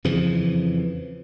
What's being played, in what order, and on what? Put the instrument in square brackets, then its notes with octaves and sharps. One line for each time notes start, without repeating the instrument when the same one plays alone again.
[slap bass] F2 C#3 E3 F3